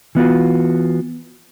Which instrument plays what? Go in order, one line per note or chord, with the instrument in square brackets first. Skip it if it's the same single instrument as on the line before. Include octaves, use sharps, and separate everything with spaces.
[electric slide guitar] E3 B3 F4 F#4